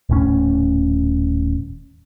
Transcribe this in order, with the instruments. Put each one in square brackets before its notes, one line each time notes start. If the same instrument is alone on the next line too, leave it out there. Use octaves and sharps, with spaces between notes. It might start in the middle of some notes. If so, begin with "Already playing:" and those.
[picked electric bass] D#1 A2 C#4